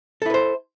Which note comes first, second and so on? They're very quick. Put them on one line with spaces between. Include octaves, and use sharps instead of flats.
A4 E4 B4 C5